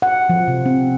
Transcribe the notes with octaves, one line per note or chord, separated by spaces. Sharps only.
F#5
F3
C3
C4